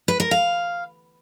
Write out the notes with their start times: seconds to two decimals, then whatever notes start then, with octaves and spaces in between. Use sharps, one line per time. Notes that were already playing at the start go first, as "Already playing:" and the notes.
0.08 B4
0.20 A#4
0.31 F5